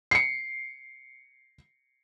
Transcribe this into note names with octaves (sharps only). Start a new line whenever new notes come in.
C7 C#7